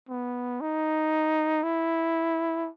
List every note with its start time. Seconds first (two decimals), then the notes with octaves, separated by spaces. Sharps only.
0.09 B3
0.61 D#4
1.63 E4